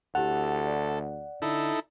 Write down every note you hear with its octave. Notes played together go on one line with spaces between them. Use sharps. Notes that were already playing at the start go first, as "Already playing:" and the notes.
D2 E4 G4 A4 F#5 F7
D5
D3 D#4 E4 A4